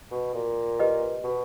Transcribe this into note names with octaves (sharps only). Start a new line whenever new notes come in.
B2
A#2
G4 B4 D#5
B2